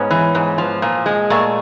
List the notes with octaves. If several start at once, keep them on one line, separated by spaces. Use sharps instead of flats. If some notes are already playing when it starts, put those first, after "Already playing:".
Already playing: G#2 B3 C#4
E3
G#2
F3
A#2
G#3
A#2 A3